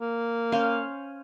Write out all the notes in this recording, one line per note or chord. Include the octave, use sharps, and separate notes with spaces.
A#3
C#4 C5 F5